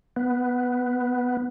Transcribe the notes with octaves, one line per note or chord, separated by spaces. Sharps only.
B3